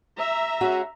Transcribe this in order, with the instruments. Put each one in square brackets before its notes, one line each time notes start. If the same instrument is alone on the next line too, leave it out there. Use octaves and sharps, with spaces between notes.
[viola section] E5 A#5
[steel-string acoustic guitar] G#3 C#4 F#4